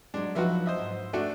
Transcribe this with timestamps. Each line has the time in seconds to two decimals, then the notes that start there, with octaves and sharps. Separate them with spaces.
0.14 F#3 G#3 D4
0.35 F3 F#3 D#4 F#4 B4 E5
0.66 C5 D#5 E5
0.78 G#2
1.13 A3 D4 F#4